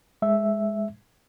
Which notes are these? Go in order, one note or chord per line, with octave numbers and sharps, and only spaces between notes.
G#3 E5